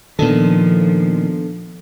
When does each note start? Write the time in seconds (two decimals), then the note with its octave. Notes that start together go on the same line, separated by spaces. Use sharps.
0.19 A#2 D#3 F3 B3 D4 A4